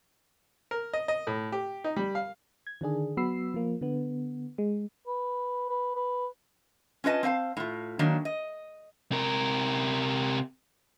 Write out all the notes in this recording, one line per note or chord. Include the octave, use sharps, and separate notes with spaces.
A#4
D#5
D#5
A2
G4
D#4
G3
F5
G#6
D3 D#3 D4 G#4
F#3 B3 F#4 B5 E6 C7
F3 A#3
D3 B3
G#3
B4
B4
B4
C#4 F4 B4 D#5 A5
C4 C5 F5 A5
A2 F4
D#3 F#3 A#3 D4
D#5
C3 A#4